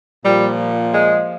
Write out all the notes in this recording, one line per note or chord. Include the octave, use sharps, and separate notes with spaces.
A#2 F3 G3
G#3